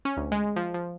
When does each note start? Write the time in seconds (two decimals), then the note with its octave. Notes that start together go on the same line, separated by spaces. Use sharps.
0.05 C#4
0.17 D2
0.32 G#3
0.56 F3
0.74 F3